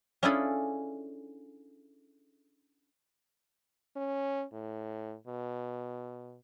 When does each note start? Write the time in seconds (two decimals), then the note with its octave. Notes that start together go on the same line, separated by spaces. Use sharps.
0.23 C#4 D4 E4 F4 G#4 A4
3.96 C#4
4.53 A2
5.27 B2